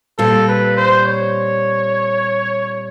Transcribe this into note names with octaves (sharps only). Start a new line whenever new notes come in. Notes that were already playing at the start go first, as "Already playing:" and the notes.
A#2 G3 C4 F4 A4
B4
C5
C#5